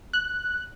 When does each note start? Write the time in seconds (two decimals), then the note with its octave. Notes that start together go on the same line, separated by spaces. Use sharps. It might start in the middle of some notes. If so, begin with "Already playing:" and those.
0.13 F#6